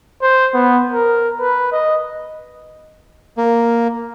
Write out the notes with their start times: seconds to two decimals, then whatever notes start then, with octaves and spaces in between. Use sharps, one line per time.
0.22 C5
0.54 B3
0.91 A#4
1.40 B4
1.72 D#5
3.38 A#3